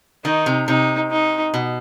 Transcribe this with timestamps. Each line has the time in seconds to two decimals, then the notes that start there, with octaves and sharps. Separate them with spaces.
0.24 D#3 D#4
0.46 C3
0.68 C3 D#4
1.11 D#4
1.54 B2